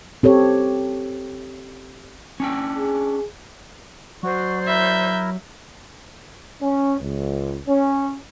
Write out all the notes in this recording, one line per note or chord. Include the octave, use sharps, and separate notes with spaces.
C4 G4 A4 C#5
C#4 D4 G5
G#4
F#3 F#4 C5 D5
E4 A#4 E5 G6
C#4
C#2
C#4